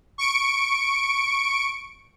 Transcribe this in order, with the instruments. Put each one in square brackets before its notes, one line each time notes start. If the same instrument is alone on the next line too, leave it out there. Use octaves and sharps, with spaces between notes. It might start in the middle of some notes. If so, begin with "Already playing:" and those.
[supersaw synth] C#6 D7